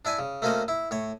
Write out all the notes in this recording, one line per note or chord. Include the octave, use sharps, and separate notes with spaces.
D4 E4 E5 G#5
C#3
A3 A#3 C#4 F#4 C5 D#5
E4
A2 C#5